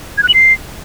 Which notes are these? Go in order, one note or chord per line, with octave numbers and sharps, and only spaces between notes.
G#6
F#6
F#7
C7